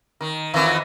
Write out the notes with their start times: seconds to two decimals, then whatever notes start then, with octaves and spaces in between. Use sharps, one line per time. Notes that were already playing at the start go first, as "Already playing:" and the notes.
0.21 D#3
0.54 F2 D#3 E3